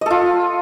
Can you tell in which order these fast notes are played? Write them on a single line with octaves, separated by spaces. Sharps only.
D#5 A4 F4